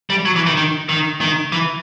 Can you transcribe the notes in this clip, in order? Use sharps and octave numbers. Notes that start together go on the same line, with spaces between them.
G3
F#3
E3
D#3
D#3
D#3
D#3
E3